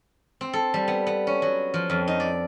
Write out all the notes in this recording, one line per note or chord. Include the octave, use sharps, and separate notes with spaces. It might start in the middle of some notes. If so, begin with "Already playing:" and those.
C4
A4
G3
B3
B3
C#4
F#3
F3
F2
D#4
D5